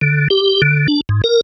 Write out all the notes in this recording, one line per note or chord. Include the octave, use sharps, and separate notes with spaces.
D3
G4
D3
D4
G#2
A#4